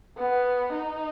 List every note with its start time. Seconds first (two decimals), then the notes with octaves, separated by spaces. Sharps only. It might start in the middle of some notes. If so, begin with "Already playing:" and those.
0.18 B3
0.72 D#4